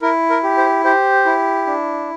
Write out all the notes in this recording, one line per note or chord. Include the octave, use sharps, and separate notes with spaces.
E4 A#4
A#4
G4
C5
G4 C5
E4
D4